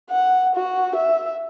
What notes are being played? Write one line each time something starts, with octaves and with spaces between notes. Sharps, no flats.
F#5
F#4
E5